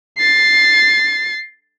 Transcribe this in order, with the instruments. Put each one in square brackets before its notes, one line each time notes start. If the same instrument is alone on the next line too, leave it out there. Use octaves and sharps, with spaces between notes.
[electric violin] A6 C7